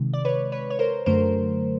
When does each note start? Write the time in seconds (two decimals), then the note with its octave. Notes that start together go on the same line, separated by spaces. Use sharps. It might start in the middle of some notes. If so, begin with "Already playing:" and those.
Already playing: C3 D#3 G#3
0.13 D5
0.25 B4 C#5
0.52 B4 C#5
0.70 C#5
0.79 A#4 C5
1.06 F#2 D3 F#3 A3 A#4 C5